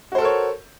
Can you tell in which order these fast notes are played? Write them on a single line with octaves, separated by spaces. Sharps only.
F#4 C5 A4 A#4 C#5